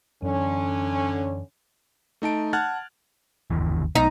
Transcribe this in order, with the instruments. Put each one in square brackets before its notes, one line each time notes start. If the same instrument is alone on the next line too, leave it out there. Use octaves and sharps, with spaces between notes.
[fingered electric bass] F#2 E3 [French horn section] D3 C#4
[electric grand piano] A3 D#4 A5 D7
F#5 A5 F6 F#6 G#6 A6
[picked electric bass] G1 D#2 E3
[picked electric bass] B1 B3 [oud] D#4